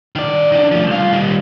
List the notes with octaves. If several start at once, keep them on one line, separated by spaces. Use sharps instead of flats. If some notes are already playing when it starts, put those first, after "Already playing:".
D#3 D5
D#3 D4
F3 A3
C2 F4
D#3 G3